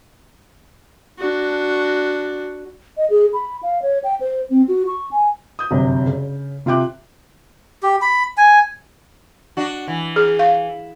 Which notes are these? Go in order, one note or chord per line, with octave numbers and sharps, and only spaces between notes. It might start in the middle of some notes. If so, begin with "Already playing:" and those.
D4 F#4
D#5
G#4
B5
F5
C#5
G5
C5
C4
F#4
C#6
G#5
D#6 G6
G1 F#2 C3
C#3
C3 F4 E5 G5 D6 F#6
G4
B5
G#5
D4 F#4
E3
G#4
F5